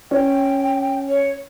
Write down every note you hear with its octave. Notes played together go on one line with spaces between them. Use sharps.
C#4 G5
C#5